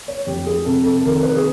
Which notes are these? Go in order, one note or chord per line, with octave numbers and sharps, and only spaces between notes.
C#5
F2 G4
G#4
C3 A4
A4
A4
D#3 A#4
B4
G#4